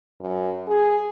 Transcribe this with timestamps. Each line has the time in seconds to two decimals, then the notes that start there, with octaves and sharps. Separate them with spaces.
0.20 F#2
0.67 G#4